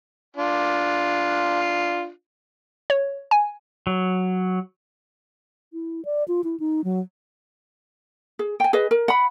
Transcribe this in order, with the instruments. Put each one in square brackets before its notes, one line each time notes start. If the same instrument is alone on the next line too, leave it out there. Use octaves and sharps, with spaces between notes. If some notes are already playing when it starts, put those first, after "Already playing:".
[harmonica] D4 F4
[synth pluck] C#5
G#5
[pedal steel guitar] F#3
[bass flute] E4
D5
F4
E4
D#4
F#3
[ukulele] G#4
G5 G#5
G#4 B4 D#5
A#4
F#5 B5